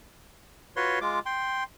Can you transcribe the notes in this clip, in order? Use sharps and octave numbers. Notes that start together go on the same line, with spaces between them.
F4 F#4 B4 C#5 C6
G#3 F4 D6
G5 C6